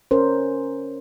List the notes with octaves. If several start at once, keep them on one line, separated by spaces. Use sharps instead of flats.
C#4 A#4 C5